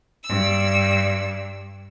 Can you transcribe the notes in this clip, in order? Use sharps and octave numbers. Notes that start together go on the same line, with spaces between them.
G2 E6